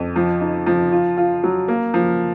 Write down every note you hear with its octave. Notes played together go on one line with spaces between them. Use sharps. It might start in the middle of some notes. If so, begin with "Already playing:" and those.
Already playing: F2
F3
D#4
F3
F4
F4
F#3
A#3
F3